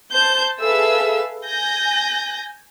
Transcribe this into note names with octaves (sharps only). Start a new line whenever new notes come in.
C5 A5 G6
G#4 A4 B4 E5 F5 E6
G#5 G6 A#6